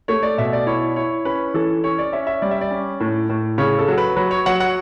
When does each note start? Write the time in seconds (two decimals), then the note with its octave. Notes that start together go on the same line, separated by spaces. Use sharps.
0.08 A3 C#5
0.23 D5
0.38 B2 E5
0.53 D5
0.66 E4 C#5
0.96 E4 C#5
1.25 C#4 B4
1.54 E3 A4
1.84 C#4 C#5
1.99 D5
2.13 C#4 E5
2.27 E5
2.42 G3 D5
2.51 E5
2.61 D5
2.71 C#4
3.00 A2
3.29 A2
3.58 C#3 C#5
3.79 A4
3.88 F#3
3.98 B4
4.16 F#3 B4
4.31 C#5
4.46 F#3 F#5
4.60 F#5